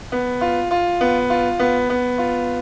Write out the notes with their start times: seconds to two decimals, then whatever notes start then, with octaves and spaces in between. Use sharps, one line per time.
0.12 B3
0.41 F4
0.71 F4
1.01 B3
1.30 F4
1.59 B3
1.90 B3
2.18 F4